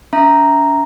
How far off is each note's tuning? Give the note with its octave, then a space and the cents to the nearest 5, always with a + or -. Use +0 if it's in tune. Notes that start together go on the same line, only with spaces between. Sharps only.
C#4 +45 E5 +0 A#5 +0